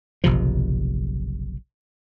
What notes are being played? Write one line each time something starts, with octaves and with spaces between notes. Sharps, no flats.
F#1 B1 C3 F3